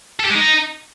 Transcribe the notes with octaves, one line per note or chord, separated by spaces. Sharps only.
A4
G4
G#3
D#4